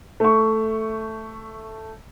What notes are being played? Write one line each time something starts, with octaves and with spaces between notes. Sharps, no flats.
A3 C#6